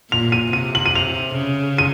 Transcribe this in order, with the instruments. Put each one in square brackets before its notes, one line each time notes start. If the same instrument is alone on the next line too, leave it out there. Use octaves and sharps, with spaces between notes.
[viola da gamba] A#2 [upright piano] F7
[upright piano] D#7
[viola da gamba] C3 [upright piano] D#7
[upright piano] F#7
D#7
F7
[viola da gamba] C#3
[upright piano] D#7